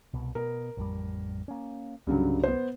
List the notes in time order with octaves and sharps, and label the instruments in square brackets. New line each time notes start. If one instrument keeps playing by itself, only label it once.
[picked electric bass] C2 B2
[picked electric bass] B2 [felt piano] A#4
[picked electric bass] A1 F2 G3
A#3 C#4
[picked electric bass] C2 [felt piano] G2 C#3 F#3
[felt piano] B3 C5